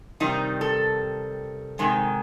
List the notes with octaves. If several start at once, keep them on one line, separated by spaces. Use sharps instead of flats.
C3 D#3 G3 D#4
A4
C3 D#3 G#3